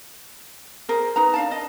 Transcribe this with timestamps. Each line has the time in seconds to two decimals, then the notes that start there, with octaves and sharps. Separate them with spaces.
0.89 G#4 A#4 C5
1.16 D#4 B4 A#5
1.34 D4 F5 A5
1.51 D#5